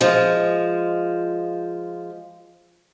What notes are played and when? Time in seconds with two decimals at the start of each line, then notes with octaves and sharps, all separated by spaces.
0.01 F3 G#3